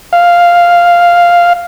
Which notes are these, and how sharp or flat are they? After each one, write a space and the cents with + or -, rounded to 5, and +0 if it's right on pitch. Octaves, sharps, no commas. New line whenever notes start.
F5 -5